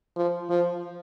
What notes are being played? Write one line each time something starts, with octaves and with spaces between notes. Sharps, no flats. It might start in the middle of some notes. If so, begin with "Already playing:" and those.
F3
F3